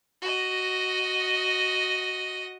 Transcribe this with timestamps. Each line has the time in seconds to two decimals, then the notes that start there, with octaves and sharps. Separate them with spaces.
0.22 F#4 D#5